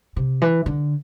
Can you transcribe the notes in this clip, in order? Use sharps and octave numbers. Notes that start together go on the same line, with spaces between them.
C3
E3
D3